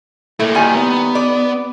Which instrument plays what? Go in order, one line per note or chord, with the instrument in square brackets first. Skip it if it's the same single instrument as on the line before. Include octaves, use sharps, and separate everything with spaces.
[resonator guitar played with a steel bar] A3 [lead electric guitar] A#3 E4
[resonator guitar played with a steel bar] D#3 G3 G#5
[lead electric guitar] B3
[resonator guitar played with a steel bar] D5